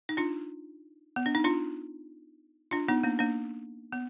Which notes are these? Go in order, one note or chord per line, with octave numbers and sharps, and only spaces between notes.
D#4
D4 F4
B3
D4
D#4
D4 F4
D4 F4
B3 D#4
A#3 D4
A#3 D4
B3